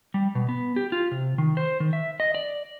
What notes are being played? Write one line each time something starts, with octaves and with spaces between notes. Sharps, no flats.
G3
B2
B3
G4
F4
C3
D#3
C5
D#3
E5
D#5
D5